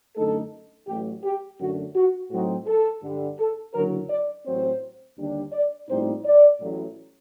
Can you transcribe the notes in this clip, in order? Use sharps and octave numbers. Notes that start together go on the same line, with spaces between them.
F#2 D3 A3 D#4 A4
A1 A2 F#3 G4
G4
F#2 D3 A3 D4 F#4
F#4
A2 F#3 C4 D#4 F#4
A4
G2 D3 G3
A4
F#1 F#2 D3 F#3 A#4
D5
A1 A2 F#3 C4 C5
D#2 D3 G3 D4
D5
A#1 A2 G3 C4 D#4 C5
D5
A1 A2 F#3